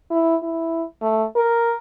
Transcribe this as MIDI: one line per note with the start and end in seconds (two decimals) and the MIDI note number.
0.11 0.36 64
0.43 0.84 64
1.02 1.24 57
1.36 1.77 70